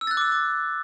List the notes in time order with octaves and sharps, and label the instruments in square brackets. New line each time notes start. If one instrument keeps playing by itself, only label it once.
[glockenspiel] E6
A6
F#6
D6
E6
D6